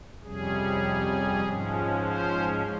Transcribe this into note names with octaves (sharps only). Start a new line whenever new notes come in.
F2 C3 G3 C#4 G#4
G#2 F3 G#3 C#4
C5